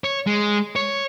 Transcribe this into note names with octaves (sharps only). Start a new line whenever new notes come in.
C#5
G#3
C#5